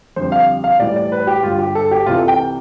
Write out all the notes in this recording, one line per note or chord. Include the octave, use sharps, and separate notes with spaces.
F2 D3 G3 C5
F5
F5
A2 E3 G3 D5
D5
B4
G4
G2 D3 G3 F4
G4
A4
G4
C2 C3 E3 F4
A4
G5